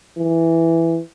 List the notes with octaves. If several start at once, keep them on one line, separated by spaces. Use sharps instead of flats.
E3